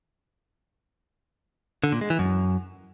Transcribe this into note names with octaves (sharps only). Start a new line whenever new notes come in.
D3
A#2
G#3
E3
F#2